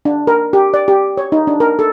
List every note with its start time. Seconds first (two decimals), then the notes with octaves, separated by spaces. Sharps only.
0.05 D4
0.27 A#4
0.53 G4
0.74 D5
0.88 G4
1.17 C#5
1.32 D#4
1.47 D4
1.60 A#4
1.79 A4